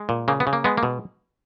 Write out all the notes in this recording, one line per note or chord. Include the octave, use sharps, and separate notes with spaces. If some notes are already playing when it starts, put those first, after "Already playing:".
Already playing: G#3
A#2
C#3 A#3
B3
C#3
A#3
G#3 B3
A#3
B2